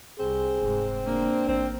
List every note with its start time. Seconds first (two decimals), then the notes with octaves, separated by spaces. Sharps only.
0.20 C2 C4 G#4
0.62 F1 G#2
1.06 A#3 D4
1.48 A1 C4